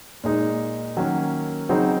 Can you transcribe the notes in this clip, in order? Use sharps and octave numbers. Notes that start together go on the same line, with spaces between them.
A#2 G#3 D#4
D#3 F#3 A#3 C#4
C#3 F#3 C4 D#4